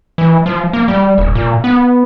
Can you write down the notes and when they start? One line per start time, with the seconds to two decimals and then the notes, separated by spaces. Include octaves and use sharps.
0.18 E3
0.46 F3
0.73 A#3
0.88 G3
1.18 D#1
1.35 A#2
1.64 B3